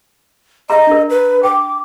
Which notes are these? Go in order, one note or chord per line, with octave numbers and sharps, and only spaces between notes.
D#5 E5 A#5
D4 A#4
B4
G5 D6